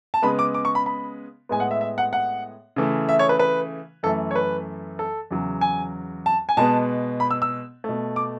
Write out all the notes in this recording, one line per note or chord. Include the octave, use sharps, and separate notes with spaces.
A5
C#3 G#3 B3 B5
D6
D6
C#6
B5
B5
A2 G#3 B3 G#5
F#5
E5
E5
F#5
F#5
C#3 E3 A3
E5
C#5
B4
B4
F#2 E3 A3 A4
C#5
B4
A4
E2 C#3 F#3
G#5
A5
G#5
B2 G#3 B3 A5
B5
E6
E6
B2 A3
D6